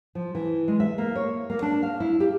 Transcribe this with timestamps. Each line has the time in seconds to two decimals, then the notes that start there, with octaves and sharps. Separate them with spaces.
0.15 F3
0.35 E3
0.68 G#3
0.80 E5
0.98 A#3
1.15 C#5
1.50 A#3
1.62 D4
1.83 F5
2.00 E4
2.20 G4